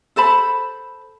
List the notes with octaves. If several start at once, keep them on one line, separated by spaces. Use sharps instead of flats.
A4 C5 A5 B5